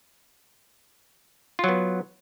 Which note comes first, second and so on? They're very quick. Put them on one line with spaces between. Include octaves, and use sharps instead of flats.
F4 F#3 B3